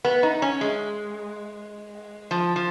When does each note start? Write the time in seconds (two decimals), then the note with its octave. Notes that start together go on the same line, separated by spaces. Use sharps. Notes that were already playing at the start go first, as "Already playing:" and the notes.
0.05 B3
0.23 D#4
0.42 C#4
0.61 G#3
2.31 F3
2.56 F3